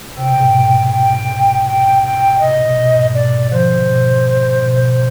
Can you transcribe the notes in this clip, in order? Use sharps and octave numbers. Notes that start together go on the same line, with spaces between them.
C3 G5
B2
G#2
B2
G5
G5
G5
C3 D#5
B2
B2
G#2
B2 D5
D3 F3 C5
B2
B2